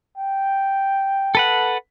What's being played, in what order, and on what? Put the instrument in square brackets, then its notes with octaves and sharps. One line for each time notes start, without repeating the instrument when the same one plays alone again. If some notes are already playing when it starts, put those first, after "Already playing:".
[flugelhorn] G5
[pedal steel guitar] A4 B4 F#5